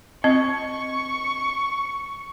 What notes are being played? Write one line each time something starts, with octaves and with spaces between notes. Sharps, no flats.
C4 D#5 C#6